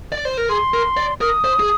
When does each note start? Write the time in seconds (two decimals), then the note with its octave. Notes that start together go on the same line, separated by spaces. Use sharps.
0.12 D5
0.25 C5
0.37 A#4
0.49 G#4 C6
0.74 A#4
0.97 D5
1.21 A#4 D#6
1.44 C5
1.60 G#4